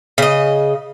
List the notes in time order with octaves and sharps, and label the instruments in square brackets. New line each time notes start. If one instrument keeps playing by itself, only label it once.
[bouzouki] C#3 D#5